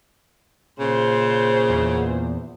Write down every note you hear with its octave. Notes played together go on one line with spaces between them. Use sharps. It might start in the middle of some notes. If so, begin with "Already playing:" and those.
A#2 C#3 C5
E2